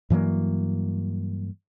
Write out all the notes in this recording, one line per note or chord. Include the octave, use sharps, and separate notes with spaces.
G2 E3 F#3 A#3